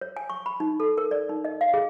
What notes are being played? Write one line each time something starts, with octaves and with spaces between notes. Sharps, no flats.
C#5
G#5
C#6
B5
D#4
A4
A#4
D5
D#4
D#5
F5
G#4